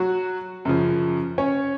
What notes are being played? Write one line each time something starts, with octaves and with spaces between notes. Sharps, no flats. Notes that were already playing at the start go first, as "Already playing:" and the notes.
Already playing: F#3 F#4
F#2 C#3 F3
C#4 C#5